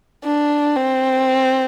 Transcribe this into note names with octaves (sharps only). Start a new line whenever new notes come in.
D4
C4